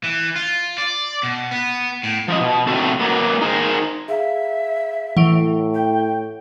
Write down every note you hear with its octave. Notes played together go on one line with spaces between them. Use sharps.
E3
F4
D5
B2
B3
A2
F3 F4 D#5
B2
B2 E3 A3 C4 F#4 A4
F#3 A#3 B3
D#4 G#4 A#4 C5
G#4 E5 F5 A#5
A2 E3 F#5 C#6 D7
G5